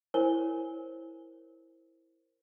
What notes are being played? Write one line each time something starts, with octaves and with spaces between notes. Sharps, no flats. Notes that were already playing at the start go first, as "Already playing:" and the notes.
E4 A#4 C5 C#5 G#5 G7